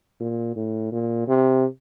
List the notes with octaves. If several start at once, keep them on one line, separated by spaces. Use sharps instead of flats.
A#2
A2
A#2
C3